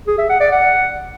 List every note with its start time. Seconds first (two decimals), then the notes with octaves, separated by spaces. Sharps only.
0.07 G#4
0.18 E5
0.29 F#5
0.40 D5
0.51 F#5